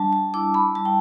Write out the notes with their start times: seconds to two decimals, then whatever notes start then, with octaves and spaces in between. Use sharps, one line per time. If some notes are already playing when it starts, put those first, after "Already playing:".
Already playing: G3 D4 A5
0.13 A5
0.34 E4 D6
0.54 B5
0.75 G3 A5
0.85 G5